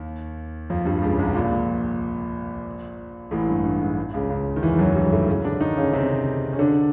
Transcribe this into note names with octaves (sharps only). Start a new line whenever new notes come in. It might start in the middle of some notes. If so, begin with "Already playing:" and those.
Already playing: D#2 D#3
F2 F3
G2 G3
C#2 C#3
C2 C3
A#1 A#2
A1 A2
G2
G2
G#2
C#2 C#3
C#2 C#3
D#3
E2 E3
F#2 F#3
G2 G3
A2 A3
C#3 C#4
D3 D4
D#3 D#4
C#3 C#4
C3 C4
C#4
D3 D4